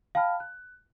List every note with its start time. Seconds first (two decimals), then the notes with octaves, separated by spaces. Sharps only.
0.15 F5 G5 A5 B5 F6
0.40 F#6